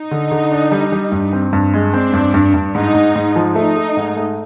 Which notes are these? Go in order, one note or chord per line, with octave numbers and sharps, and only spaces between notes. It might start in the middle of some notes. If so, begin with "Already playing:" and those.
Already playing: D#4
D3
D3
D4
G3
G3
G2
C4
G2
G#3
C4 D4
G2
G2
G2
G#2 D#4
G#2
G#2
F3
A3 D#4
A3
G#2
A3